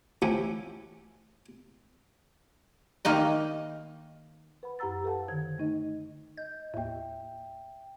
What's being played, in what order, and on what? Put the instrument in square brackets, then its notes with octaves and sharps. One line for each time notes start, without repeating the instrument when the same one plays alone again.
[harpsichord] E3 F3 A3 C#4 E4 G4
[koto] D#3 A#3 D#4 D#5
[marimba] B4 F#5 B5
F#2 G4 F#5 A#5 E6 A6
A4 B4 F5 F#5 A5
D3 D#3 G#6
A3 D#4 D#5
[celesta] D#5 [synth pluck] G6
[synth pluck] D#2 A2 [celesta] E5 G5